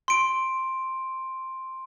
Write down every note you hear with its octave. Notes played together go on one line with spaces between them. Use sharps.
C6 D7